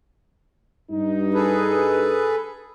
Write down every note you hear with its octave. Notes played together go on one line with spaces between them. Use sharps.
G2 D#4
G#4 A4 B4